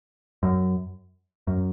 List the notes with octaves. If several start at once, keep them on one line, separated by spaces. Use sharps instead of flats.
F#2
F#2